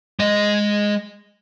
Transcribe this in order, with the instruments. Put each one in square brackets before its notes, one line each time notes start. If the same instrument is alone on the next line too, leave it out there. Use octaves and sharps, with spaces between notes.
[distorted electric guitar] G#3 D#5